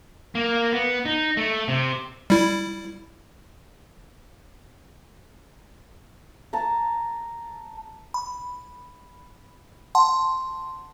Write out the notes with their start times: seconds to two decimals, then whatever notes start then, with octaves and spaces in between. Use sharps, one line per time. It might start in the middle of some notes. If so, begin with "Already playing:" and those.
0.35 A#3
0.73 B3
1.05 D#4
1.37 A3
1.68 C3
2.30 G3 E4
6.53 A5 A#5
8.14 B5
9.95 F#5 A5 C6